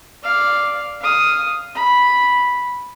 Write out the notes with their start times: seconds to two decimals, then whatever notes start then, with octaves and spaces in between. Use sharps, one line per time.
0.23 D5 F5
1.02 F5 D#6
1.75 B5